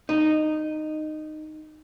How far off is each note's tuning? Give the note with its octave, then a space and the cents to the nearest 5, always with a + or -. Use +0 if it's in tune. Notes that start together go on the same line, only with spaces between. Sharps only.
D#4 -15